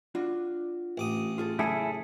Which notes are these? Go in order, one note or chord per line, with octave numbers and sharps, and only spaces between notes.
D4 F4 F#4
A1 D6 D#6
F4 G#4 A4
F#2 C#3 E3 E4 G#4 A4